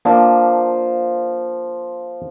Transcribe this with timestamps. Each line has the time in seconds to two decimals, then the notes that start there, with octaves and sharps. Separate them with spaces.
0.05 F3 A#3 D4 F4